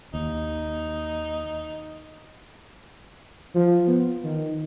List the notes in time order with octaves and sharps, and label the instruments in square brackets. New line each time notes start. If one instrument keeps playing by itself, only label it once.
[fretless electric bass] D#2 [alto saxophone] D#4
[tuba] F3
B3
D#3